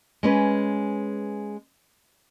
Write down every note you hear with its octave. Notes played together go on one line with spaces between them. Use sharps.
G#3 C#4 B4